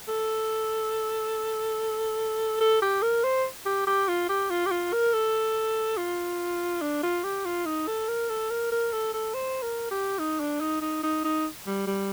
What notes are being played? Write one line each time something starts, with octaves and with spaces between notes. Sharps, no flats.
A4
A4
G4
A#4
C5
G4
G4
F4
G4
F4
G4
F4
A#4
A4
F4
D4
F4
G4
F4
D#4
A4
A#4
A4
A#4
A#4
A4
A4
C5
A#4
G4
D#4
D4
D#4
D#4
D#4
D#4
G3
G3